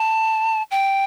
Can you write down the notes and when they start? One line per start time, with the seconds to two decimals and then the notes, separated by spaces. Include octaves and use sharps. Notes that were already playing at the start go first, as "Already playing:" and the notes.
Already playing: A5
0.71 G5